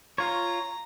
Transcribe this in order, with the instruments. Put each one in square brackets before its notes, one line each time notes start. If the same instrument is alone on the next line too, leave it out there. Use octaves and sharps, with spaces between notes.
[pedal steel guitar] F4 C#5 [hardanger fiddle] A#5